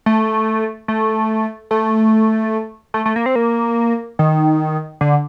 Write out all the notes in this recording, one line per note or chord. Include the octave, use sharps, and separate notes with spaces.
A3
A3
A3
A3
A3
A#3
C4
A#3
D#3
D3